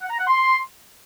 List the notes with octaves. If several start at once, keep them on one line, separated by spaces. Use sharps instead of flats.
F#5
A#5
F#5
C6